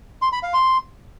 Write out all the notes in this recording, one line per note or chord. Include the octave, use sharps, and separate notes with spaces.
C6
B5
F5
C6